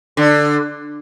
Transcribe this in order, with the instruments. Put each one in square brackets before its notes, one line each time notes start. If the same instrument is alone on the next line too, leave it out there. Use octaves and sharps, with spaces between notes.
[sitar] D3